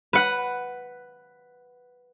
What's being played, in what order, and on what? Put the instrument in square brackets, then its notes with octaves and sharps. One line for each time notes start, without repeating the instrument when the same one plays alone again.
[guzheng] B4 F#5